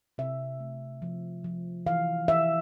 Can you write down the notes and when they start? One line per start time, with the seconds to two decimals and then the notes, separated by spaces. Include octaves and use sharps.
0.18 C3 E5
0.60 A3
1.02 F3
1.44 F3
1.86 E3 F5
2.28 E3 E5